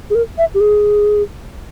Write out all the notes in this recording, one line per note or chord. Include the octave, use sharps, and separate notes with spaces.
G#4
A#4
E5
G4
G#4